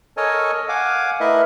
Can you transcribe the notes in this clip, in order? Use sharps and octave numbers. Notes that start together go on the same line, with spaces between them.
A4 A#4 C#5 D#5 G#5 A5
F5 F#5 G#5 D6
A3 E4 A#4 B4 D#5 E5